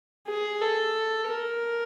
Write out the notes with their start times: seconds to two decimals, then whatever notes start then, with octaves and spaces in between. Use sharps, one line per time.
0.27 G#4
0.61 A4
1.27 A#4